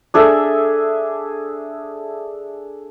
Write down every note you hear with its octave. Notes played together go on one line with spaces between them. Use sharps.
D4 G#4 A4 E5